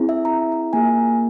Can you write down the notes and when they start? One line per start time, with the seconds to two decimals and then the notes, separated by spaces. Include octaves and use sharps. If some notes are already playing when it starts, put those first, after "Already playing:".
Already playing: C4 E4 G#4
0.09 E5
0.25 A#5
0.52 A#5
0.73 A#3 F4 G#4 G#5